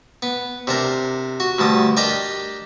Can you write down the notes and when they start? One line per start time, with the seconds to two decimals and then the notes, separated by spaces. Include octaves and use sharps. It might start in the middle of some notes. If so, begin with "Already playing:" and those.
0.22 B3
0.67 C3 D4 A#4
1.40 F#4
1.59 D2 G2 A5 D#6
1.97 D4 G4 A#4 D5 D#5 A#5